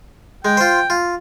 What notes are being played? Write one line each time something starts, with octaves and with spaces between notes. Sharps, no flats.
G#3 G5
F4 C5
F4